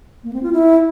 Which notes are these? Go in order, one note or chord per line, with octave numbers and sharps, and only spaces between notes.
A#3
C4
F4
E4